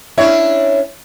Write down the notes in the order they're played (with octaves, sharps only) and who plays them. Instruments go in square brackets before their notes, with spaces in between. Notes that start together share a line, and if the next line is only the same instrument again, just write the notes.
[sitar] C#4 D4 C#5 [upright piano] E4